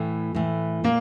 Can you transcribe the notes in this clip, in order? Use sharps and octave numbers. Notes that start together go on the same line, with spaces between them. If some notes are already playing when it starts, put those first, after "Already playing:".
Already playing: A2 E3 A3
A2 E3 A3
A#2 A#3